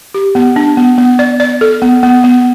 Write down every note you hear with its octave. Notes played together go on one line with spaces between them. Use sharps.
G4
B3
D4
B3
B3
D5
D5
A4
B3
B3
B3